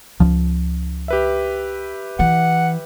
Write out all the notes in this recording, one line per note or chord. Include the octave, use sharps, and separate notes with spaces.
C#2 F3 C#4
G4 B4 E5
E3 F#5